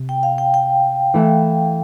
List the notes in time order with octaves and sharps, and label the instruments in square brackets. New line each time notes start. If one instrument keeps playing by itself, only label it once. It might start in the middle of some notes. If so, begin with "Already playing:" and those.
Already playing: [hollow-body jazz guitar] C3
[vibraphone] G5
F5
G5
G5
[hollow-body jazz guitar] E3 A3 E4